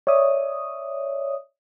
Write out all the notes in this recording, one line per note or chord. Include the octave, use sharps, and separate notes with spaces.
C#5 D5 E5 D#6